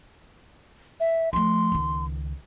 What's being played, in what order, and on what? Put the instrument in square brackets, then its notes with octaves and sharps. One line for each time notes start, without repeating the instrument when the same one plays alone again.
[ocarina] E5
[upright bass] F3 A3 [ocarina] C6
[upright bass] C#2 D#3